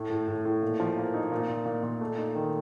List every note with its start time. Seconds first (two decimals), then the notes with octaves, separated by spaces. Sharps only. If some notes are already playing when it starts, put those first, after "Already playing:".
Already playing: A2 A3
0.10 A2
0.28 A2
0.45 A2
0.62 A#2
0.80 F3
0.97 A#3
1.14 D#4
1.32 A#2
1.49 A#2
1.66 A#2
1.83 A#2
2.01 A3
2.18 D#4
2.35 D#3